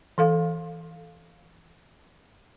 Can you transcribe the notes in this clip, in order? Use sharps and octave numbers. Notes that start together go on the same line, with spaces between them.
E3 A4 F5